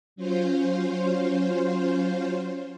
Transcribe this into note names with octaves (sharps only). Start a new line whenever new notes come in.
F#3 C#4 F4 C5